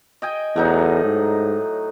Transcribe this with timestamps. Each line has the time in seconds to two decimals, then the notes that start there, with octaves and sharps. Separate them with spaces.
0.22 D#5 G5 G#5
0.56 E2 A2 F#3 D#4
1.04 G#2